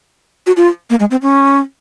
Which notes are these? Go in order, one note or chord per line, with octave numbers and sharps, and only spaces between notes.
F#4
F4
A#3
G#3
C4
C#4